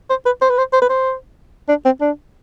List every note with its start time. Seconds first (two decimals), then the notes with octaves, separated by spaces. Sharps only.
0.10 C5
0.26 B4
0.41 C5
0.50 B4
0.58 C5
0.73 C5
0.81 B4
0.89 C5
1.69 D4
1.85 C4
2.01 D4